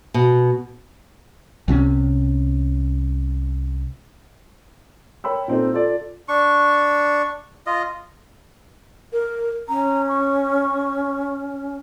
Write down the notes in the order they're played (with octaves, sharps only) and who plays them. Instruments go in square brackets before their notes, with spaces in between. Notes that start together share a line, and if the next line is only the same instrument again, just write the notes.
[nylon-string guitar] B2
[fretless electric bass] C2 C3 C4 C#4
[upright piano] A#4 C#5 G5 B5 E6
A#2 C4 D#4 A4
F4 A4 D5
[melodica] D4 C#6
F4 D#5
[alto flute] A#4
[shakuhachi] C#4 [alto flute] A#5
[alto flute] C#6